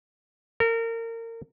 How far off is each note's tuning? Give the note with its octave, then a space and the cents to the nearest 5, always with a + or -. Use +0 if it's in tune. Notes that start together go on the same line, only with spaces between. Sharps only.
A#4 -30